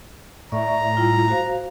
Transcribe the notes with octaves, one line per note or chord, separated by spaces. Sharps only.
A2 D5 E5 A#5 C#6
G3 E4 F4
F#4 C5 F5